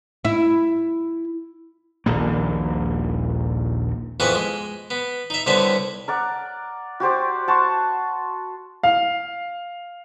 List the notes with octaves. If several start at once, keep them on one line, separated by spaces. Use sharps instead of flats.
E4
D#1 A#1 A#3
F2 E3 B3 G#4 F#5 C#6
G#3
B3
D#4 E5
C2 D3 B3 C4 C#5 E5
A#4 D5 F#5
F#4 G4 C5 D5
F#5 A5 C6 C#6
F5